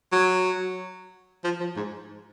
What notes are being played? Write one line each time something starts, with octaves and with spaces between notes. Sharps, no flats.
F#3
F3
F3
G#2